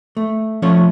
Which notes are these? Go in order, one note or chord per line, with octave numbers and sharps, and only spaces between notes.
A3
F3 A3 C#4 F4 C#5